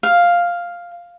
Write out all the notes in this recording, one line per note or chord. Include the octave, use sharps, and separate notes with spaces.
F5